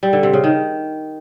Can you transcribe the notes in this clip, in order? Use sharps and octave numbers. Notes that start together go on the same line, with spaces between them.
G3
D3
C3
C#3
D#3